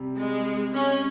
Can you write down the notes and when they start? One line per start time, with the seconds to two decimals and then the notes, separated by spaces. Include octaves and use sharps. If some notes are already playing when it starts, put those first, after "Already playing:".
Already playing: C3 G3
0.17 G#3
0.74 C#4